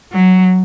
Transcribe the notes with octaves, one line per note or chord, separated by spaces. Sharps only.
F#3